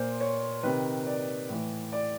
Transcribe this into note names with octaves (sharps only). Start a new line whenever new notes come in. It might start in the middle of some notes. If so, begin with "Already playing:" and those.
Already playing: A#2 C5
C#5
C3 D#3 B4
D5
A2 E3
D5